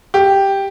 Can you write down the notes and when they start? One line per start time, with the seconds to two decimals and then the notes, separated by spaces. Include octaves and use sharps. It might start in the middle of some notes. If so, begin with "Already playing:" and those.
0.14 G4